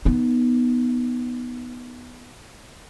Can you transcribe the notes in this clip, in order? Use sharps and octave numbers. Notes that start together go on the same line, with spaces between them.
B3 D#4